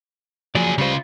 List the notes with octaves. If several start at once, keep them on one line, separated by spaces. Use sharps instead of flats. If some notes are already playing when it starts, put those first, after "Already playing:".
F3 F#3 G#4 D5
C#3 G3 F4 C5